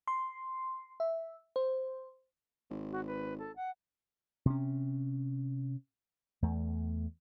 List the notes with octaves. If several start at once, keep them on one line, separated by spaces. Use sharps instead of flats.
C6
E5
C5
G#1
F#4
B4
A4
F#5
C3 C#4
E2 A3